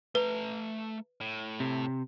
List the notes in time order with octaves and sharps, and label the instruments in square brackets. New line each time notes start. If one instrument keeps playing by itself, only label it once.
[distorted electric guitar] A3 A#5 [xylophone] B4
[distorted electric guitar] A2
[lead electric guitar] C3